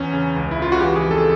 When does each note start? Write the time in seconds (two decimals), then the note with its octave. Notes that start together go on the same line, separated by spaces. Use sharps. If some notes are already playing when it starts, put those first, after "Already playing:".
Already playing: E2 C#4
0.14 C#3
0.36 C#2
0.51 E4
0.59 C#3 F4
0.72 F#4
0.80 E3 G4
0.96 G#4
1.03 F2
1.11 A4